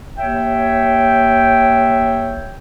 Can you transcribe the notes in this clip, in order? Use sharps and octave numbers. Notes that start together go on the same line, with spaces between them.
D#2 C#5 E5 G5